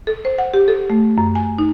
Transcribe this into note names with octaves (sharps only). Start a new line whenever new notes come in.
A4
C5
F#5
G4
A4
A3
F#2
G#5
D#4